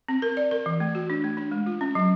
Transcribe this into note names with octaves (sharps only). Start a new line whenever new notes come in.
C4
A#4
D5
A#4
E3
A3
F#4
D4
A3
D4
G#3
F4
C#4
F#3